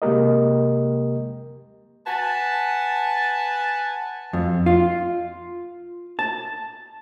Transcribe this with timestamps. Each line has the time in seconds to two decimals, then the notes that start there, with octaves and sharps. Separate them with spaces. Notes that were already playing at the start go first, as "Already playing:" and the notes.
0.02 C3 G#3 A#3 G4 A#4 D#5
2.07 B4 F#5 G#5 A5
4.33 F2
4.66 F4
6.19 A5